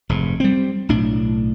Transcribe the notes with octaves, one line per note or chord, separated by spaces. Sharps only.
F1 G#2
G3 C4
B1 A2 D4